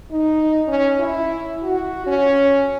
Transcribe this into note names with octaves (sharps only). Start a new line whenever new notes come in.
D#4
C#4
E4
F#4
C#4